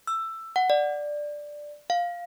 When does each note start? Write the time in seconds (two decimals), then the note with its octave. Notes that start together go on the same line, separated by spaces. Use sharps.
0.07 E6
0.56 F#5
0.70 D5
1.90 F5